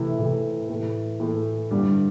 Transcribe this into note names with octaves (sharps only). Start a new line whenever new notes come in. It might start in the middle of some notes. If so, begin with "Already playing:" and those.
Already playing: C3 E3 A3 E4
C3 E3 A3 E4
A2 E3 A3
A2 E3 A3
G2 D3 G3